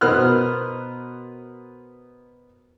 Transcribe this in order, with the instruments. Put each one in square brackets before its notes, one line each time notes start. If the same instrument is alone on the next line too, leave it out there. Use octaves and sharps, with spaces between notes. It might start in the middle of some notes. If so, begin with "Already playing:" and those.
[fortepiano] B2 B3 A#4 C5 F6 F#6